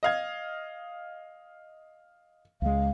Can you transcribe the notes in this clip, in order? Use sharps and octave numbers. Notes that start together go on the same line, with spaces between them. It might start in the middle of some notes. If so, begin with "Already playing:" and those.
D#5 F5 G#6
C#2 G#3 F5